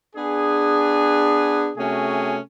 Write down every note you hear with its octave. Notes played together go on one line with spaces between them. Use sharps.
B3 D4 G#4
C3 A3 C#4 F#4 G#4